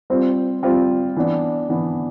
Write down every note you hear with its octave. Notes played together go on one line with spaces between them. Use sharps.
G3 C4 F4 C5
G3 C4 F4 C5
E3 B3 D4
E3 B3 D4